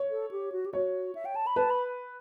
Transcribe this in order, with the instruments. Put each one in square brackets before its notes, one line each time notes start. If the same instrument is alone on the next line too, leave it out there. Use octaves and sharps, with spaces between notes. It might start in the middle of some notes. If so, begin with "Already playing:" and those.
Already playing: [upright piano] C#5
[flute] A4
G4
F#4
G4
[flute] F#4 [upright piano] C#5
[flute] E5
G5
A5
B5
[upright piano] B4 [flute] A5
[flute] B5